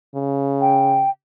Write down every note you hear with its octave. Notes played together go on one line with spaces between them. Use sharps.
C#3
G5